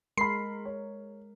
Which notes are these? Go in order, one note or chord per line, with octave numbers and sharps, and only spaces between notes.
G#3 A#4 B5 C6 C7
C#5